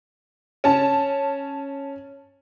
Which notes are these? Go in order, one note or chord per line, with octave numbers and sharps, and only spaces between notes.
C#4 A5